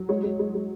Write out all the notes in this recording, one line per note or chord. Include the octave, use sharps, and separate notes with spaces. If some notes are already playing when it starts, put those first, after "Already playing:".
Already playing: F#3
G#3 C#5
G#3
G#3
G#3